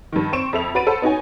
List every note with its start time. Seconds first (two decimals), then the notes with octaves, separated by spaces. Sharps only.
0.13 G2 D#3
0.32 C4 C5 C#6 D7 E7
0.53 F2 A4 E5 F7
0.75 F#4 B4 B5 A6 D7 D#7
0.87 A4 C5 F#5 B5
1.02 B3 D#4 F#4 C#5 G#5